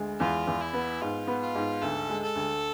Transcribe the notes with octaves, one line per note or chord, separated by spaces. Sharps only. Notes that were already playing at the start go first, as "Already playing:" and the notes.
Already playing: D2 G#3
E2 F4
E2
E4
B3
G#2 F4
B3
F4
G#2
D2 A4
G#3
A4
D2